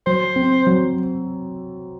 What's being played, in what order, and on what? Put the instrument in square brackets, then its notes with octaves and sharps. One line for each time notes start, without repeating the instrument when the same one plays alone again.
[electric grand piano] F#3 [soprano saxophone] C5
[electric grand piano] C4
F#3